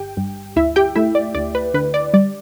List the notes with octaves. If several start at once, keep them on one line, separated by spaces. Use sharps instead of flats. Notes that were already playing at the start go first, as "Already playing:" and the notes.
Already playing: G1 G4 G5
G2
D2 E4 E5
G4 G5
A3 E4 E5
D5
D2 D5
B4
D3 B4
D5
G3 D5